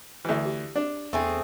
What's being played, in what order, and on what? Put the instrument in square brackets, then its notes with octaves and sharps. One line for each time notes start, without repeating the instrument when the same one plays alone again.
[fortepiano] D2 E3
[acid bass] G4
[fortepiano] D4
[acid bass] E2 [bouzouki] A3 C4 G#4